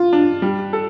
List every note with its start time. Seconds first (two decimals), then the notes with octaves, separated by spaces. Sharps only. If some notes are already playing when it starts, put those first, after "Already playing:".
Already playing: F4
0.13 D4
0.42 G3
0.73 A4